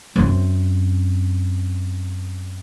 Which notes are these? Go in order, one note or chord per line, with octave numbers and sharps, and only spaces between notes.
F#2 C4